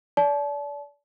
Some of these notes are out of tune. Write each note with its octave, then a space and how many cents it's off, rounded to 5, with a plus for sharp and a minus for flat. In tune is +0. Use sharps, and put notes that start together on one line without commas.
D5 -30 A5 -30